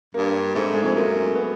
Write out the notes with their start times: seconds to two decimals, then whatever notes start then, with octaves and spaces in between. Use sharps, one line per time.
0.14 G2 A#3
0.55 G#2 A3
0.74 G#3
0.83 F2 A3
0.95 F#2 A#3
1.35 B3